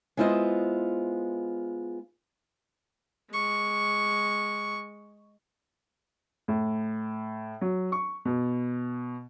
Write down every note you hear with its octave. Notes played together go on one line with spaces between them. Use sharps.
G#3 B3 E4 F4 C5 D#5
G#3 C#6
A2
F#3
C#6
B2